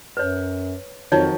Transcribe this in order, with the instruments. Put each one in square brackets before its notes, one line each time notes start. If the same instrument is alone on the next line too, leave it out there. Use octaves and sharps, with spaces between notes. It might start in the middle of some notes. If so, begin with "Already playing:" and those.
[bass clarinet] F#2 [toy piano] B4 C#5
[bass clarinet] F2 [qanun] D#3 F3 F#3 [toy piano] D#4 C#5